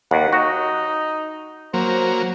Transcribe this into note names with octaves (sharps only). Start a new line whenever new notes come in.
D#2 F#5
D#4 F#4
F#3 A#3 C5